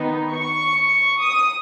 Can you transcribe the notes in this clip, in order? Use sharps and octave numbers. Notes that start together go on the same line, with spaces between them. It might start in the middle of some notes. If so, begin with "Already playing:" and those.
Already playing: D#3 B3 D#4
C#6
D#6